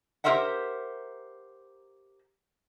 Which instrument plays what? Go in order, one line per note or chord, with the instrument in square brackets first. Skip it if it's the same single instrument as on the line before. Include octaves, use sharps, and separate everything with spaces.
[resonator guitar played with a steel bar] G4 A4 A#4 C5 E5 F#5